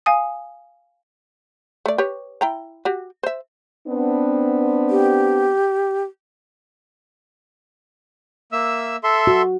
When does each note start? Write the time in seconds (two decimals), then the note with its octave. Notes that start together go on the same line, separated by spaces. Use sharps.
0.06 F5 G#5 D#6
1.86 A3 D5
1.98 G4 B4 C#5
2.41 E4 G5 A#5
2.85 F#4 G4
3.23 C5 E5
3.87 B3 C4 D4
4.90 G4
8.52 A#3 E5 E6
9.03 A4 E5 C6
9.27 F#4